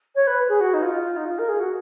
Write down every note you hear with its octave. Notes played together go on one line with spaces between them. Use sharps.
C#5
B4
G#4
F#4
D#4
F4
D#4
F4
A#4
G#4
F#4